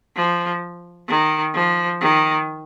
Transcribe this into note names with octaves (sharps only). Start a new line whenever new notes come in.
F3
D#3
F3
D#3